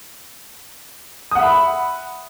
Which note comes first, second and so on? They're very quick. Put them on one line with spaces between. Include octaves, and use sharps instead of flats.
D#6 F#5 E5 B5